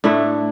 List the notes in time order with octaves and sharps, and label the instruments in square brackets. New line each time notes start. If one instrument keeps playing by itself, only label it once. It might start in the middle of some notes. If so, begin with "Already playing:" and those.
[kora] A2 A3 E4 [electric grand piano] D4